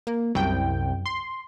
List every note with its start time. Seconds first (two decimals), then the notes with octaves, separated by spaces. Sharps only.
0.07 A#3
0.35 C2 F#2 G5
1.06 C6